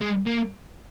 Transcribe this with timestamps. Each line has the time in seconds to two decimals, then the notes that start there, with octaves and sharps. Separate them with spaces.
0.01 G#3
0.27 A#3